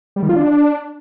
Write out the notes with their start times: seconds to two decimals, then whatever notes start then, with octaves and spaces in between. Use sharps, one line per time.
0.16 G3
0.23 D#3
0.29 F4
0.36 D4